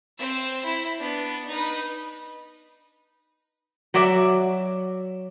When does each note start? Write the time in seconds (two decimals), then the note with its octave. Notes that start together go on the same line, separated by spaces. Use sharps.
0.18 C4 E6
0.64 E4
0.98 B3 D4
1.48 D#4 B4
3.94 F#3 F#4 D5 E5